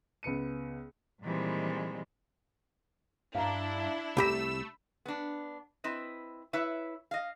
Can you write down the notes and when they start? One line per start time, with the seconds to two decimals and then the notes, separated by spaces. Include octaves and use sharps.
0.23 C#2 B3 C#7 D#7
1.22 A#2 D#3 E3 G3 G#3 C4
3.35 G2 D4 E4 F5 A#5
4.17 C2 A3 G4 A#5 B5 E6 B6
5.05 B3 D4
5.84 C4 E4 B4 D#5
6.53 E4 B4 C#5 E5
7.11 D#5 F5